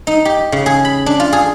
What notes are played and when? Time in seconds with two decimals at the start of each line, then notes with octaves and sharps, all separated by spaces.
0.07 D#4
0.25 G4
0.52 C#3
0.66 G#4
0.85 B5
1.06 D4
1.20 F4
1.33 G#4